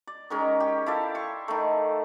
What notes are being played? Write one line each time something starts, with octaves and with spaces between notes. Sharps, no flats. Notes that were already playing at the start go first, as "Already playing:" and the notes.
D5
D#3 G#3 C#4 A#4
G4
E4 A4 D5 F5
C6 C#6
D#3 A3